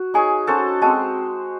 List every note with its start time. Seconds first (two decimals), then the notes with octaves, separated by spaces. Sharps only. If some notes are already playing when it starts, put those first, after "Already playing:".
Already playing: F#4
0.14 D#4 G#4 C#5 G#5
0.47 C#4 F#4 A4 C5
0.82 G#3 C4 F#4 C5 A5